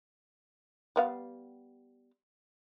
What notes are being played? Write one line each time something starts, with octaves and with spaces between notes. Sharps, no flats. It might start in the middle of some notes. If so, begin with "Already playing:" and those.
G3 B3 F5